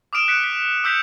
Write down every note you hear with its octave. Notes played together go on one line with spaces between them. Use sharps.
D6 D#6 F6 D7 E7
F#6 B6 C#7 D7
B6
D6 E6 G6 B6 C#7 F7